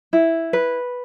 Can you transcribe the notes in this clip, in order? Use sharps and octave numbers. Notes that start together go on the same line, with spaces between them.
E4
B4